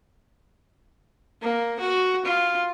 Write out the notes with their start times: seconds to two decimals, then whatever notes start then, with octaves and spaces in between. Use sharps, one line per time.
1.42 A#3
1.80 F#4
2.25 F4